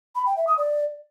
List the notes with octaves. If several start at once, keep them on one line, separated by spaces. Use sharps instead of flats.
B5
G5
E5
D#6
D5